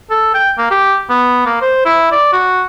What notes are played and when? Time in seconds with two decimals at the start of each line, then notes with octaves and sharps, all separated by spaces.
0.10 A4
0.34 G5
0.58 A#3
0.71 G4
1.09 B3
1.46 A#3
1.61 C5
1.85 E4
2.12 D5
2.33 F#4